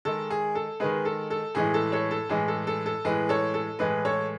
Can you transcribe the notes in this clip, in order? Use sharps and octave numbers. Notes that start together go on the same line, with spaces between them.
D#3 G#3 A4
G#4
A4
D#3 G#3 G#4 B4
A4
A4
A2 E3 G#3 G#4
A4
A4 C#5
A4
A2 E3 G#3 G#4
A4
A4
A4
A2 E3 G#3 G#4 B4
A4 C#5
A4
A2 E3 G#3 G#4 B4
A4 C#5